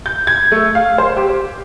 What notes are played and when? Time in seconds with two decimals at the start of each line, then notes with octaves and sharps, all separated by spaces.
0.06 G6
0.27 G#6
0.52 A3
0.75 F5
0.98 C5
1.17 G4